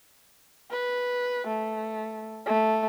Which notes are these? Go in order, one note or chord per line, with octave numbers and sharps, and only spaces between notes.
B4
A3
A3